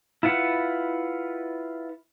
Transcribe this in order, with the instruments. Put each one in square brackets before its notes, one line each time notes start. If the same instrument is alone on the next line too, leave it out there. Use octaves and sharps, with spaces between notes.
[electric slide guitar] E4 F4 B4 F#5